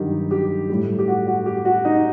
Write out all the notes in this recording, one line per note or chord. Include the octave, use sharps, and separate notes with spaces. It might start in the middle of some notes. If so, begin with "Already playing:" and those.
Already playing: G2 D#3 F#3 G4
G4
A2 G3
G4
F#4
F#4
G4
F#4
D#4